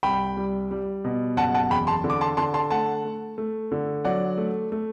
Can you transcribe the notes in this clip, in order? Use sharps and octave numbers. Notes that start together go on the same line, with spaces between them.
C2 G5 B5
G3
G3
B2
F#1 F#5 A5
F#5 A5
E2 G5 B5
A5 C6
D3
D6
A5 C6
D3 A5 C6
A5 C6
A3 F#5 A5
A3
A3
D3
F#3 D5 F#5
A3
A3